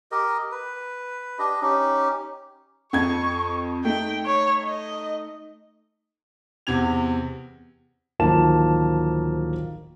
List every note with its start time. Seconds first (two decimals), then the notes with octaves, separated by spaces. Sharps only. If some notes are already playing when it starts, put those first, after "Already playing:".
0.12 G4 A#4 D#5
0.52 B4
1.39 D4 G4 D#5
1.62 C#4 D#4 G4
2.93 F2 C#6 G#6
3.85 A3 D#4 G5
4.25 C#5
4.64 D#5
6.67 E2 C3 G#6 F7
8.19 D1 D#3 F3 A#3 A5 E7